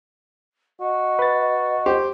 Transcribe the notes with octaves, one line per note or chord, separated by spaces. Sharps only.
F#4 D#5
B4 A6
G4 C5